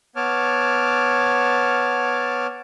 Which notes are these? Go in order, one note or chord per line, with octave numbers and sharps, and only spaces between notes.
B3 C#5 A5 D6 F6